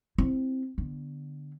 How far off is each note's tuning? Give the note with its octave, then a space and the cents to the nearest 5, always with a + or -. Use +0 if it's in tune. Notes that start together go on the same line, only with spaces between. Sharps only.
C4 +0 E4 +0
D3 +0 B3 -15